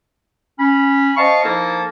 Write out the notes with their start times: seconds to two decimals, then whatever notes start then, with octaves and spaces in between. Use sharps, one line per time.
0.59 C#4 B5
1.17 C5 D#5 F5 A5 C#6
1.45 F3 A#3 D#4 E4 A4 A#4